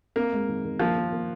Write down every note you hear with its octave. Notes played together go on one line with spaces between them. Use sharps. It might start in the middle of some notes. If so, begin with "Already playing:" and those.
A#3 C4
G#3
D#3
D#3
F3 A#3
A#3
A#3